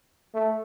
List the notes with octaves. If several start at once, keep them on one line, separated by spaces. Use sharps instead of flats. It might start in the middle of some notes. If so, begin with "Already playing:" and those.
A3